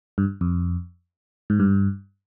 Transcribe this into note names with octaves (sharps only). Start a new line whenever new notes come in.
G2
F2
G#2
G2